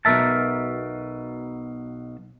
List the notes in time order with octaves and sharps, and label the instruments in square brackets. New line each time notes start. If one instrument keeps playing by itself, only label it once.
[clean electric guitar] B1 B2 A3 A#4 E5 A5